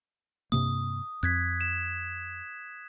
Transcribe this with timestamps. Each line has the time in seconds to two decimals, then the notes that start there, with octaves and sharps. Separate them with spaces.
0.52 G2 C3 A#3 D#6
1.23 F2 F#6 G#6 B6
1.61 E7